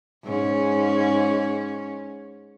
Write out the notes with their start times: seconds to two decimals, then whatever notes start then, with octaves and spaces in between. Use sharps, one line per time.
0.24 G#2 C#4